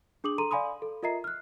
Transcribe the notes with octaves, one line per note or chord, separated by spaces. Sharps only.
D4 G#4 D6 D#6 F#7
A4 A#5 C6 D#7
D5 F5 G#5 B5 C6 D#6
A4
F4 A#4 D#5 E5 A#5 C7
F6 F#6